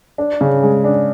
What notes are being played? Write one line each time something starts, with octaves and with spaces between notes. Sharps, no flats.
D4
C#3
G#3
D4